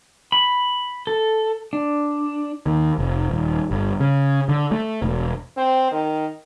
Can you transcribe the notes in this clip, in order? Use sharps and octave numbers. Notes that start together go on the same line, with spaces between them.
B5
A4
D4
D#2
F1
D#1
G1
C#3
D3
A3
E1
C4
D#3